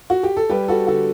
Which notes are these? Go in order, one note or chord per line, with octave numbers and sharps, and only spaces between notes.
F#4
G4
A4
G3 G4 B4
F#4 A4
D3 F#4 A4